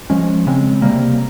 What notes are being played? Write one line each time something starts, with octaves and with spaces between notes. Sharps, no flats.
F3 G#3 C#4
C#3 G#3 C4
C3 G3 A#3